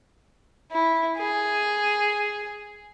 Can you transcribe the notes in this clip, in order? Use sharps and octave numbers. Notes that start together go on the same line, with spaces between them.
E4
G#4